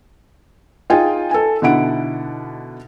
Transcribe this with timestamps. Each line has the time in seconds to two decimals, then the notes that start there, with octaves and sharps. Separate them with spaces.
0.90 D#4 F4 G#4 G5 G#5
1.31 A4 G#5
1.62 B2 D3 D#4 E4 F#5 D7